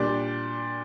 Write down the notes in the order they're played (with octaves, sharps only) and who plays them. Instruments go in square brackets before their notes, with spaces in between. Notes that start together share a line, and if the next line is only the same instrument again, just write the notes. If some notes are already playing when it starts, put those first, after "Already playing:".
Already playing: [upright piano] A#2 G3 D4 G4 [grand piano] D5